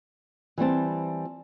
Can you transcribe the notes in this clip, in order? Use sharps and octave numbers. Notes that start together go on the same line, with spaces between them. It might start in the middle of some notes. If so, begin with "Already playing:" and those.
E3 G3 C4 A5